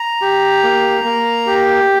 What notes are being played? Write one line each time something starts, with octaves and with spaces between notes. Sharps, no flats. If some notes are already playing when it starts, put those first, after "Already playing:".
Already playing: A#5
G4
A#3
A#3
G4